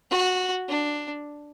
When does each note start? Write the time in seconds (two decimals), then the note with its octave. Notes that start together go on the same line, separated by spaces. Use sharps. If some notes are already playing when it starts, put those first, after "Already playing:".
0.10 F#4
0.69 D4